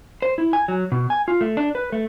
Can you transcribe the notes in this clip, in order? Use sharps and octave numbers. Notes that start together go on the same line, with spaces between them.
C5
E4
G#5
F#3
B2
G#5
F4
A3
D4
B4
A3